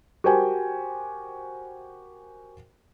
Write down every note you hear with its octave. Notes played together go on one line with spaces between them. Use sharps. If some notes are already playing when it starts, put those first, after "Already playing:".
F#4 G4 A#4 C5 G5 G#5